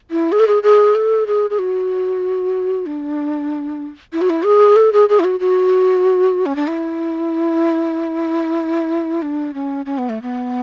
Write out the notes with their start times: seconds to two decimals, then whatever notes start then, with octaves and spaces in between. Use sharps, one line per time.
0.10 E4
0.32 G#4
0.40 A4
0.48 G#4
0.63 G#4
0.95 A4
1.27 G#4
1.50 G#4
1.59 F#4
2.86 D4
4.13 E4
4.21 F#4
4.30 E4
4.45 G#4
4.76 A4
4.93 G#4
5.09 G#4
5.20 E4
5.24 F#4
5.40 F#4
6.46 C#4
6.56 D4
6.67 E4
9.22 D4
9.54 C#4
9.86 C#4
9.98 B3
10.09 A3
10.22 B3